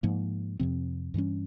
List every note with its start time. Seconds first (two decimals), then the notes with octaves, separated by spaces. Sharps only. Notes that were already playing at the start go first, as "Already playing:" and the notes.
0.03 G#2 F3 A#3
0.59 F2 C3 F3 C4
1.14 G2 E3 G3 C#4